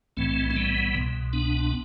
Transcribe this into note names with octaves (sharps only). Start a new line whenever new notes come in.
B1 A2 E3 A3 C4
C4
G3 B3
C2 B2
B3 D4